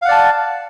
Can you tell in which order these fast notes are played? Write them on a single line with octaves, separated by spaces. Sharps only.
F5 F#5 D5 A5